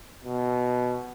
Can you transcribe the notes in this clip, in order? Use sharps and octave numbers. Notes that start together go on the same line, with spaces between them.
B2